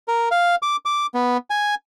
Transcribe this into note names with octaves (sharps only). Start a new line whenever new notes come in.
A#4
F5
D6
D6
B3
G#5